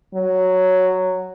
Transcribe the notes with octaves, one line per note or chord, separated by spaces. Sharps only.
F#3